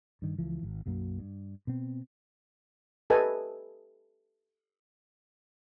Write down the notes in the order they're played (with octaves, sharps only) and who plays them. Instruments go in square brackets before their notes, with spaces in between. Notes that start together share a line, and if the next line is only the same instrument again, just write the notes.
[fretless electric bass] G2 D#3
C#2 E3 F3
G#1
B1 F#2 F#3 A#3
G2
B2 C4
[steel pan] G4 A4 B4 D#5 G#5